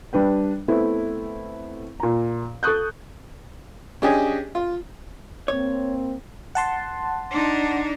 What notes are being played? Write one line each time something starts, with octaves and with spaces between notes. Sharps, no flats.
G3 D4 B4 G5
A3 B3 C4 E4
A#2 A#5
A4 C#6 D#6 F#6 G6
C#4 D4 G4 G#4 D#5 G#5
F4
A#3 C4 C#5
F#5 A5 C6
D4 D#4